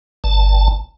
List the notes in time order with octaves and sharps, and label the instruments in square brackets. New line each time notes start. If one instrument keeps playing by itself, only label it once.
[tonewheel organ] G1 A5